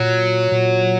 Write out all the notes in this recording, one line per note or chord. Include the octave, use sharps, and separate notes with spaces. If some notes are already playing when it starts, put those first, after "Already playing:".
Already playing: A#2 F#3
A#2